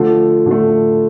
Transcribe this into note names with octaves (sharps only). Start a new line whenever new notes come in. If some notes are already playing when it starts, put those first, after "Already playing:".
Already playing: D3 F3 A3
D3 F3 A3